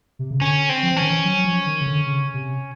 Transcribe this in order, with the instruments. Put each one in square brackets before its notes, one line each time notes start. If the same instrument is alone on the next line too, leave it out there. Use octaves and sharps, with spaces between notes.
[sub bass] C3
C#3
[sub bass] D3 [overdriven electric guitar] C#4
[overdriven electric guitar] C4
[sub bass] F3
E3
[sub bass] D#3 [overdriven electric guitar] C#4
[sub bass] E3
F#3
F#3
F3
D#3
C#3
D3
C#3
C3